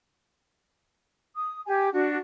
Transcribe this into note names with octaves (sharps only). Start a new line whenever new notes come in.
D#6
G4 G#5
D4 F#4